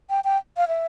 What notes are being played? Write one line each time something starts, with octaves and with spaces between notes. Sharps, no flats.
G5
G5
F5
E5